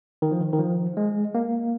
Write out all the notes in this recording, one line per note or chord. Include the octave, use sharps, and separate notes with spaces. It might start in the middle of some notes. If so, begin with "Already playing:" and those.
D#3
F3
D#3
D#3
F3
G#3
A#3